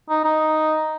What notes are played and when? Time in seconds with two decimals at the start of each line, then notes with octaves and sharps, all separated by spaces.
0.10 D#4
0.24 D#4